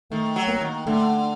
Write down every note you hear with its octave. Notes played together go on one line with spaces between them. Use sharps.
D#3 A3
F#3
A#3
D#3
D3 A3